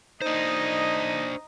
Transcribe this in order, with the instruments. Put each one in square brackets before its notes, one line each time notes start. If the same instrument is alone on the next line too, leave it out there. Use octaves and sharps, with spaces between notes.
[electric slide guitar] D4 C5 [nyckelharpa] D#4 D#5